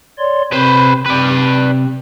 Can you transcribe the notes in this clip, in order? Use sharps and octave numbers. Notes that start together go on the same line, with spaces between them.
C#5 D5 C6
C3 C4 B4 C5
C3 C4 B4 D5